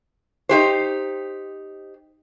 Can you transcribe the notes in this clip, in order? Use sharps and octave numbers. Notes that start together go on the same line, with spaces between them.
D#4 G4 C5